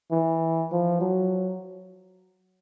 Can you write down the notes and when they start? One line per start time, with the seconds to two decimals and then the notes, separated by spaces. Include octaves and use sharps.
0.12 E3
0.72 F3
1.01 F#3